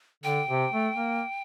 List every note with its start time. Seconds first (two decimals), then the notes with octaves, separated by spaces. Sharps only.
0.24 D3 G5
0.49 C3
0.72 A3
0.96 A#3